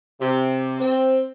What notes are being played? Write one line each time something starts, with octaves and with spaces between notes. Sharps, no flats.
C3
C4